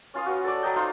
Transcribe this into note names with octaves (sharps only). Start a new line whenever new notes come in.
C#4 F4 F5 D#6
F#4 B4
A4 D5
F#3 D#5 G5
D#4 F4 C5